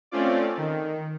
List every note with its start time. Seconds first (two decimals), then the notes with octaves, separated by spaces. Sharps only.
0.11 A3 C4 C#4 F4 D5
0.57 D#3